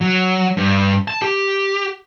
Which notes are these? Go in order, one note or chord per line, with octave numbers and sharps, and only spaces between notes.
F#3
G2
A5
G4